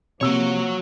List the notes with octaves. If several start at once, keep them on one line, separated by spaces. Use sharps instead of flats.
C3 F3 A#3 F#4 C#5 E6